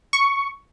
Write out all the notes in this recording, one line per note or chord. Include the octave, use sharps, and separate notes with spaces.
C#6